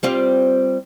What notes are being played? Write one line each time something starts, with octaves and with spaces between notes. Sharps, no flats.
G3 C4 F4